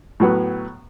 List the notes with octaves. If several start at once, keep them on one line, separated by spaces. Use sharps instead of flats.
A2 F#3 B3